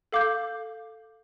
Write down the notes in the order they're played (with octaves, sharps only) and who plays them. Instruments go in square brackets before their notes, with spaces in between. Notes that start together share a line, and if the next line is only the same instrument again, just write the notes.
[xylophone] A4 F5 D6 G6